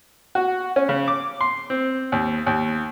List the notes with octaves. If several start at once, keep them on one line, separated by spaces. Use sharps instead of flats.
F#4
C#4
C#3
D6
C6
C4
D#2
D#2